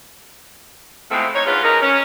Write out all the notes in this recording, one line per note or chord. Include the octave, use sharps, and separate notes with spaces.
B2 E3 F3 G#3 A3 C4
D#4 C#5
G#2 D3 C#4 F4 G#4 B4
F#3 G#3 C#4 D#4 A#4
C#4